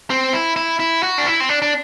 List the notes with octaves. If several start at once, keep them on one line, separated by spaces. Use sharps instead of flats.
C4
E4
E4
E4
F#4
D4
E4
C4
D4
D4